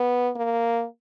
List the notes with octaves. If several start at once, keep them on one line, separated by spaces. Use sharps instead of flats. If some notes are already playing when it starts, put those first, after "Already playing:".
Already playing: B3
A#3